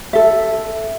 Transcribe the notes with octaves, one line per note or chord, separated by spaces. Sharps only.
A4 E5